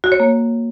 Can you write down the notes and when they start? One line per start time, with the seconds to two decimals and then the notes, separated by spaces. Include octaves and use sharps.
0.04 F#4
0.12 C#5
0.20 A#3